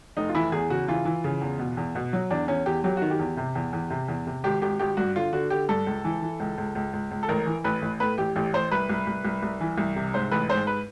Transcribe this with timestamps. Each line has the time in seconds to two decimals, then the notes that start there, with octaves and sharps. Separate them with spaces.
0.17 F1 D#4
0.29 F4
0.35 E3 E4
0.52 E2 G#4
0.70 C#3 F#4
0.88 E3 F4
1.05 E3
1.24 C#3
1.41 E2
1.59 B2
1.77 E2
1.95 B2
2.13 F#3
2.30 E2 D4
2.48 E2 C#4
2.66 E2 G4
2.84 F#3 G4
2.97 D#3 F#4
3.10 G4
3.19 E2
3.37 C3
3.55 E2
3.73 E2
3.90 C3
4.08 E2
4.27 C3
4.44 G#1 G4
4.62 G#1 G4
4.79 G#1 G4
4.97 G2 F#4
5.15 D3 F4
5.33 D3 F#4
5.50 D3 G4
5.69 G2 A4
5.86 C#2
6.05 E3
6.22 E3
6.40 C#2
6.58 C#2
6.75 C#2
6.93 C#2
7.11 C#2
7.23 A4
7.29 A1 A#4
7.46 E3
7.64 A1 B4
7.82 A1
8.00 A2 B4
8.18 A1 G4
8.36 A1 G4
8.53 A1 C5
8.71 C2 B4
8.89 C2
9.07 C2
9.25 C2
9.43 C2
9.61 E3
9.78 C2
9.96 C3
10.14 G#2 C5
10.31 A1 B4
10.49 G#2 C5
10.67 B4